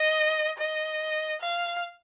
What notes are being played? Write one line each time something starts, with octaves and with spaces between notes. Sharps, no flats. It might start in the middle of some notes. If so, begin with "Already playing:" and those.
Already playing: D#5
D#5
F5